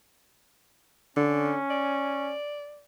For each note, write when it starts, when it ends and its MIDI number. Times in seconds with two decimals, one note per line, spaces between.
1.17 1.57 50
1.17 2.34 61
1.70 2.85 74